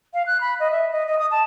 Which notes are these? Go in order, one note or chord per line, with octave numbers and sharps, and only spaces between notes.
F5
F#6
B5
D#5
E5
D#5
D#5
D#6
A5